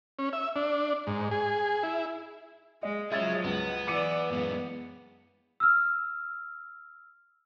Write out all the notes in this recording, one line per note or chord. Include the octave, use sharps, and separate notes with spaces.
C#4
E5
D4
G#2
G#4
E4
G#3 D#5
F3 F#3 G#3 G#4 C#5 E5 G#6 A6
C#2 B3
E3 D5 D6 C#7 D#7
F#2 G#3 B3
E6 F6